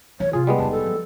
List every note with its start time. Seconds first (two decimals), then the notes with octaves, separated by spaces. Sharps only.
0.20 E3 C#5
0.33 C3 F4 G#4
0.47 G3 G#3 B3
0.58 E1 D#4 A5
0.71 A4
0.86 F3